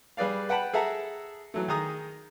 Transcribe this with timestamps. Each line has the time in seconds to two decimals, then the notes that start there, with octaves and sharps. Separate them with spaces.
0.17 G3 G#4 B4 D5 F5
0.49 B4 F#5 G5 A5 B5
0.74 G#4 A4 E5 F#5 A#5
1.54 E3 F#3 A3
1.68 D#3 G#4 A#5 D#6